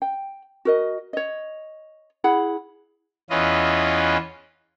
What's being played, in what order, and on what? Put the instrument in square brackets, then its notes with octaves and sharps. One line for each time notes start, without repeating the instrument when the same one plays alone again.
[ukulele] G5
F#4 A#4 D#5
C#5 D#5
E4 G#4 F#5 B5
[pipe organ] E2 E3 C#4 F4 B4 D#5